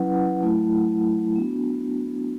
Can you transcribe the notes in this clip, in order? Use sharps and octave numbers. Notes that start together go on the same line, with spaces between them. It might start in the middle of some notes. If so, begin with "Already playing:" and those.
Already playing: F#3 C#4 E4 B4 F#5
F#3 A3 E4
B3 D4 F#4